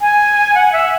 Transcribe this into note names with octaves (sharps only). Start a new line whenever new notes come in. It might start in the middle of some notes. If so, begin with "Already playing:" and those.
G#5
F#5
E5